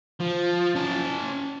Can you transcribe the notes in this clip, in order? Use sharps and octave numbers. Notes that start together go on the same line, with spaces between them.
F3
C#4 A5